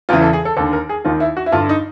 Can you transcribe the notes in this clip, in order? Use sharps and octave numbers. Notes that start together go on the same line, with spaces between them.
E2 C#3 E3 F4
A4
G#4
A4
D#2 D3 A4
A#4
G#4
D#2 D#3 F4
E4
F#4
E4
G2 D3 F4
D#4